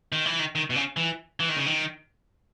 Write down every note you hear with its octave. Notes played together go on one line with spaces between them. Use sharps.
D#3
E3
D#3
D#3
B2
C#3
E3
E3
D#3
C#3
D#3